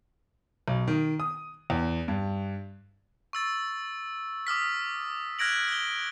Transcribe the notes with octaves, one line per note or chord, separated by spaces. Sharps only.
B1
D#3
D#6
E2
G2
C#6 E6 A6
D6 D#6 F6 B6
F6 F#6 G#6 A#6 D7 F#7
A#6 G7